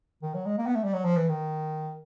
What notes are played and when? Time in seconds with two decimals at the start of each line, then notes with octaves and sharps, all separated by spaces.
0.23 D#3
0.34 F#3
0.46 G#3
0.58 A#3
0.67 B3
0.75 A3
0.84 G3
0.93 F#3
1.05 F3
1.17 E3
1.29 D#3